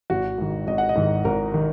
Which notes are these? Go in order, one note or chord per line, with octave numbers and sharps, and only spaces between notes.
G#1 F#4
G#2 D#3
G#1 D#5
F#5
D#5
G#2 D#3
G#1 A#4
D#3